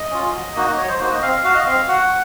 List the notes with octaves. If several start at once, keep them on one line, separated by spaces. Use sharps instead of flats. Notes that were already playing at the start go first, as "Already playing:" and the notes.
Already playing: D#5
C#4 F4
F#3
A#3 D#4 F#4
F#3 C#5
C5
A#3 D#4 F#4 C5
D#5
C4 F5
F5
F#4 F5
D#5
C4 F5
F#4 F#5